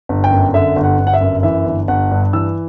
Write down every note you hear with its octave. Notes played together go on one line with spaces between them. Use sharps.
G1
G5
F#2
D3 E5
G1
F#5
G1
F#5
E5
F#2
E3 E5
G1
G1 F#5
G2
E3 E6